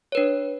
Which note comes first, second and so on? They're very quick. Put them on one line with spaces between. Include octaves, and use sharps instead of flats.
C#5 B4 D4